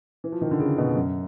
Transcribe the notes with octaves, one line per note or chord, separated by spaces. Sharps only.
E3
F3
D#3
D3
C#3
B2
F#2